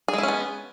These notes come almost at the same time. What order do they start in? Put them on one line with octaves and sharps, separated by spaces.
G#4 G#3 E4 C#4 B3